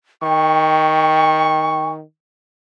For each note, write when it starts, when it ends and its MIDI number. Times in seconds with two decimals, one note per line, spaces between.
0.23 2.02 51
0.23 1.90 79
0.23 1.93 85